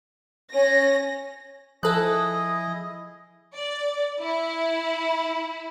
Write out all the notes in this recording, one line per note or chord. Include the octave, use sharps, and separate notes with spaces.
C#4 C#5 A#6
F3 E4 G#4 A4 D#5 D#6 F#6
D5
E4